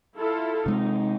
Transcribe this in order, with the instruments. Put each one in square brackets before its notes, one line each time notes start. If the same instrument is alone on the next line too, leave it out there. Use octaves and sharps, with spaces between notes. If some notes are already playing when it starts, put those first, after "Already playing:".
[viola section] E4 F4 A4
[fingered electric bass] C3 G#3 C4 [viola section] D#4